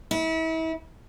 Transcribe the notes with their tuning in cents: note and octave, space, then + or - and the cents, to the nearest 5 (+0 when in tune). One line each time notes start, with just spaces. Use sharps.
E4 -35